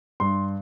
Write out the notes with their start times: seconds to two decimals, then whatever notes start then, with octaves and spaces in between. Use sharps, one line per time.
0.20 G2 C6